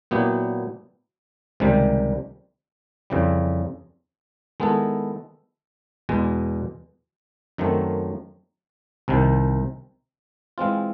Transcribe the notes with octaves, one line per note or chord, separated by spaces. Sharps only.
A#2 F#3 B3 E4 G4
C#2 C3 D#3 G3
F2 C#3 E3 G3
D#3 G#3 B3 E4 A4
E2 B2 G#3
F#2 D#3 F#3 A3 C4
C2 C3 D#3
E3 G#3 C4 F4